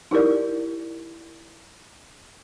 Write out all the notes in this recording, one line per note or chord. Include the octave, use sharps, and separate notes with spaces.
D#4 E4 G4 A#4 D5